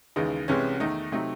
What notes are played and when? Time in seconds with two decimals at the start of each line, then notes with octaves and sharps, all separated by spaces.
0.16 D#2 C#3 E3 G#3 D#4
0.48 C2 C3 E3 G#3 C#4
0.80 E2 D#3 A3 D#4
1.12 C3 F#3 A3 D#4